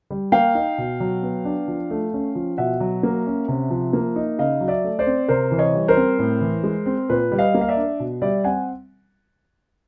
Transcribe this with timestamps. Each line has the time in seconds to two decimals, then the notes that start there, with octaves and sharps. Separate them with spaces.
0.11 G3
0.32 A#3 F5 G5
0.55 D#4
0.78 B2
1.00 F#3
1.22 B3
1.45 D4
1.68 F3
1.90 A3
2.14 C#4
2.35 F3
2.58 B2 E5 F#5
2.80 F#3
3.03 A#3
3.26 C#4
3.48 C3
3.70 F3
3.93 A#3
4.16 D#4
4.38 C#3 D#5 F5
4.61 F#3
4.68 D5 E5
4.84 A3
4.99 C5 D5
5.06 C4
5.28 C3 A#4 C5
5.51 E3
5.59 C#5 D#5
5.74 G3
5.88 A#4 C5
5.97 C4
6.19 A2
6.41 E3
6.63 G#3
6.86 C4
7.09 A#2 B4
7.32 G3
7.38 D#5 F5
7.54 A#3
7.61 F5
7.69 D5 E5
7.76 D4
8.00 B2
8.22 G3 D5 E5
8.44 C4 F#5 G#5